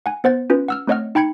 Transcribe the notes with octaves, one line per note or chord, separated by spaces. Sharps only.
F#5 G#5
B3 C5 F#5 A6
C#4 F4 B4
F#5 E6 F6
A3 C4 C#5 D#5 F#5 F6
D#4 G5 B5 G#6 C#7